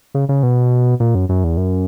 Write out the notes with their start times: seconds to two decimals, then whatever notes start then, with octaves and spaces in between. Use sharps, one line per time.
0.14 C#3
0.29 C#3
0.43 B2
1.00 A#2
1.15 F#2
1.29 F#2
1.44 E2
1.57 F#2